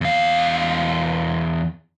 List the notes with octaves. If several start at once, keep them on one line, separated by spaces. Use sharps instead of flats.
E2 F5